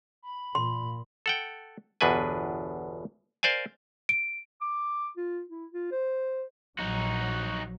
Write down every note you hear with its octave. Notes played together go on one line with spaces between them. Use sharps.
B5
A#2 C6
A4 F#5 G5
G1 E2 B2 D4 B4 G#5
A#4 C5 D5 F5 G#5
D7
D6
F4
E4
F4
C5
A#1 F#3 D#4 F#4